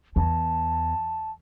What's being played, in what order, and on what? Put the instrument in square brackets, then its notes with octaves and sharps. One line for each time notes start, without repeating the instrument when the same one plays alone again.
[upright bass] E2 [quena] A5